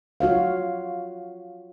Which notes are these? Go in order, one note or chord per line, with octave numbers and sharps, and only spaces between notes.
F4 F#4 C#5 F5